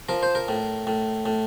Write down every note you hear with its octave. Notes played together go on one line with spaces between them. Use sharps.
F3 A#4
C5
A#4
A2
A2
A2